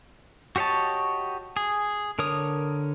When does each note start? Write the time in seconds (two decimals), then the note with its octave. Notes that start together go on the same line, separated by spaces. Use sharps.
0.56 F#4 G4 C#5 D#5 A5
1.57 G#4
2.19 D3 A#4 C#5 D#6